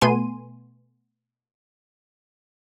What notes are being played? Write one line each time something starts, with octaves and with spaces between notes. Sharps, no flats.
B2 A3 B3 G#5 C6 D#7